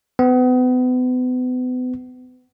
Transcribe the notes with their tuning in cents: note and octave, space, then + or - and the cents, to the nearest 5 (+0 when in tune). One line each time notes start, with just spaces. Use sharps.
B3 +35